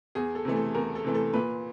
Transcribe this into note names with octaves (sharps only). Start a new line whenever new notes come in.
E2 G#4
A4
C3 E3 A3
A4
E2 A#4
A4
C3 E3 A3
A4
A#2 B4